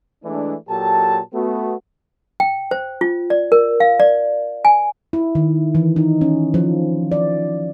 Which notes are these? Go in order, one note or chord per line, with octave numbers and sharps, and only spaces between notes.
E3 G#3 A3 D4
A#2 F#3 G4 A4 A5
A3 B3 F#4
G5
C5
F4
D5
A#4
F5
D5
G#5
E4
D#3
E3
D#4
C#4
F3
D5